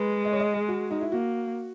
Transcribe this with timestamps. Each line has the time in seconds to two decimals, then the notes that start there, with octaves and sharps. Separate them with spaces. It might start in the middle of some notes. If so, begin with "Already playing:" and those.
Already playing: G#3 B4
0.25 D#5
0.32 C#5
0.40 D#5
0.54 G#4
0.68 F#4
0.91 D#4
1.01 E4
1.12 A#3 F#4